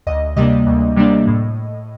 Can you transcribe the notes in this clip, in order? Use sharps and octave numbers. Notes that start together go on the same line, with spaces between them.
D2 D#5
C3 G3 A#3 D4 D#5
D2
C3 G3 A#3 D4
A2